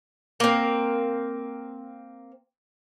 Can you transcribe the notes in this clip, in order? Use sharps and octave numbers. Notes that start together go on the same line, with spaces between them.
A#3 C4